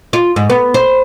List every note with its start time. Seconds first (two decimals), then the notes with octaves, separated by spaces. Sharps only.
0.13 F4
0.36 G#2
0.50 B3
0.74 C5